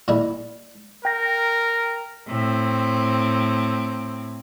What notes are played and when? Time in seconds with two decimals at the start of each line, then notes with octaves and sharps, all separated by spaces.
0.08 A#2 D#3 G3 D4 E4
1.05 A#4 G5 A#6
2.27 A2 C4